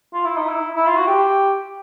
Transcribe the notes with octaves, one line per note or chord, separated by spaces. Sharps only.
F4
E4
D#4
E4
E4
F4
F#4
G4